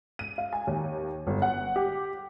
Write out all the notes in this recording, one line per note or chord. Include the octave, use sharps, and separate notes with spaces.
D#7
F5
G#5
D#2
G1
F#5
G4